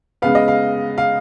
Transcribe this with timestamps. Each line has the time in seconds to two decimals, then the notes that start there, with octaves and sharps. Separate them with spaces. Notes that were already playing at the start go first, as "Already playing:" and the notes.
0.22 C#3 G#3 B3 F5
0.35 D#5
0.48 F5
0.98 F5